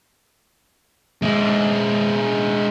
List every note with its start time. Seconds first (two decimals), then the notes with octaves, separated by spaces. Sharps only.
1.22 G#3 E4